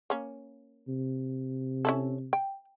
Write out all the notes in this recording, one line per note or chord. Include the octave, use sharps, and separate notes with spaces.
A#3 C#4
C3
C#4 E4 A4
G5